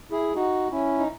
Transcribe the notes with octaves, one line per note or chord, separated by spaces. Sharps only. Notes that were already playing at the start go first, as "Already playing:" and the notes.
E4 G#4
D#4 F#4
C#4 E4
D#4